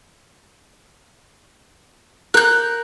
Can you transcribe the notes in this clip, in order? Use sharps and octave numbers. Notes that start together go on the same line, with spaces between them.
A#4 F#6 G6